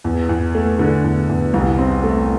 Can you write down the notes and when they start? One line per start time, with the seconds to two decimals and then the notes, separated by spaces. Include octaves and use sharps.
0.04 E2
0.29 E2
0.55 A3
0.79 D3
1.04 E2
1.29 E2
1.54 C2
1.79 C4
2.04 A3